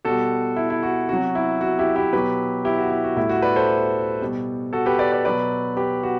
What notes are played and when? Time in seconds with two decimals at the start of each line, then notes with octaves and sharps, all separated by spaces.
0.05 B2 G3 F#4 A4
0.56 E4
0.70 E4
0.83 F#4
1.09 C3 F#3 F#4
1.35 E4
1.61 F#4
1.79 E4 G4
1.96 E4 G4
2.13 B2 F#3 G4 B4
2.65 E4 G4
2.78 F#4
2.90 E4
3.04 F#4
3.17 A2 G3 E4
3.29 F#4
3.42 B4 D5
3.56 A4 C5
4.21 B2 G3
4.73 F#4 A4
4.86 G4 B4
4.99 B4 D5
5.12 B4 D5
5.25 B2 F#3 B4 D5
5.77 G4 B4
6.03 F#4